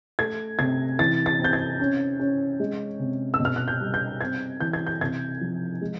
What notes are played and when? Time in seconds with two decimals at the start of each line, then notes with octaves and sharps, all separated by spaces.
0.19 A3 G#6
0.59 C3 G#6
0.99 E3 A6
1.26 A6
1.39 C4 G6
1.53 G#6
1.80 C#4
2.20 C#4
2.60 G#3
3.00 C3
3.34 E6
3.40 B2
3.45 F6
3.56 F#6
3.68 G6
3.80 G3
3.94 G6
4.21 C4 G#6
4.60 E3 G6
4.73 G#6
4.86 G6
5.01 C3 G#6
5.41 F3
5.81 G#3